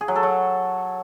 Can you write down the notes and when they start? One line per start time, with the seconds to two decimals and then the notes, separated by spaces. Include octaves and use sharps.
0.01 G#4
0.08 F#3
0.16 A4
0.23 F#3